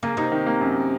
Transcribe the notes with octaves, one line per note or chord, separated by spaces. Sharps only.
C#3 A#3
C3 D#4
D#3
A#3
F#2